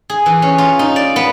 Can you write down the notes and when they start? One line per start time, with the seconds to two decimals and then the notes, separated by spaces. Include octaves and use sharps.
0.10 G#4
0.26 E3
0.42 C#4
0.58 F4
0.79 D#4
0.96 D5
1.16 B3